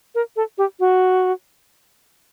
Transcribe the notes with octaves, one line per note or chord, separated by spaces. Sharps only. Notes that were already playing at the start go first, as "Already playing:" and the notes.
A#4
A4
G4
F#4